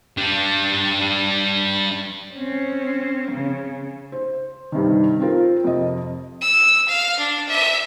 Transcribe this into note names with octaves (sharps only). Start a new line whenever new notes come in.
G3 D4
C4 C#4
C#3
C5
G2 C3 D#3
C4 F4 A#4
F2 C3 D#5
E6
F5
D4
E5